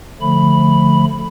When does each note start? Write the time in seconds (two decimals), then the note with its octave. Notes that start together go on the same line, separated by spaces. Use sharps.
0.21 D3 F3 A3 B5